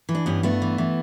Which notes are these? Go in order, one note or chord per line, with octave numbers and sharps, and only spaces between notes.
E3
D4
G2 B3 C#4
G2 A3 B3
E3
E3